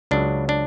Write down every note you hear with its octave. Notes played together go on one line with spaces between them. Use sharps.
C#2 C#3 F#3 D4
D4